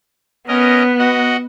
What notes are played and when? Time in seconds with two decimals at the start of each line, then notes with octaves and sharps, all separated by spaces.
0.48 B3 C#4 A#4 D#5
0.99 F#4 D#5 F#5